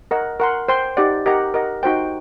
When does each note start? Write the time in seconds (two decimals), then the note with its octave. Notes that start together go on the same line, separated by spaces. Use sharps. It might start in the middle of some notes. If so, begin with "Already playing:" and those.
0.11 A#4 D#5 F#5
0.40 A#4 F#5 C6
0.68 C5 G5 C6
0.97 D#4 G4 D5 F#5
1.26 G4 A#4 D#5 F#5 A#5
1.54 A#4 D#5 F#5
1.83 D#4 F#4 C5 G5